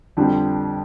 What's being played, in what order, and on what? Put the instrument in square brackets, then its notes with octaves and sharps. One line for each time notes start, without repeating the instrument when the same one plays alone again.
[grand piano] F2 D3 G3